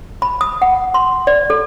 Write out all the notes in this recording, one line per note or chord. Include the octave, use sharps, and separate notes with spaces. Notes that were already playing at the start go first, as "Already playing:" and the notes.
B5
D#6
F#5
C6
D5
A4